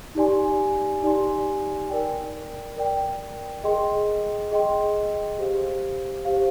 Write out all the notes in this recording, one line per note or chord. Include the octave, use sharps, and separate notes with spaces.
D#4 G4 D5 G#5 C6
D#4 G4 D5 G#5 C6
A#4 D5 G5
A#4 D5 G5
G#4 D#5 G5 C6
G#4 D#5 G5 C6
G4 C5 F5
G4 C5 F5